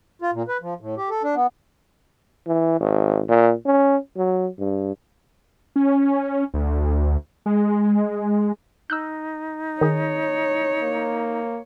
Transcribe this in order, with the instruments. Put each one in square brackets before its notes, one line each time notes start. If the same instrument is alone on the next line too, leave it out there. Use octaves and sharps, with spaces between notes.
[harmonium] F4
A#2
B4
F3
A2
G4
A4
D4
B3
[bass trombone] E3
G#1
A#2
C#4
F#3
G2
[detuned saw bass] C#4
D2
G#3
[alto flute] D#4 [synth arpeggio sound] E6 F#6 G6
[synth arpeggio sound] D#3 G#4 [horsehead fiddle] C#5
[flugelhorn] A#3